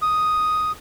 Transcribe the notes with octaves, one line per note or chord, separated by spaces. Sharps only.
D#6